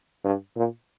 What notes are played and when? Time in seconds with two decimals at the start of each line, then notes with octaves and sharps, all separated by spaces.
0.24 G2
0.56 A#2